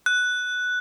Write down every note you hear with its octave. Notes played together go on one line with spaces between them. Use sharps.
F#6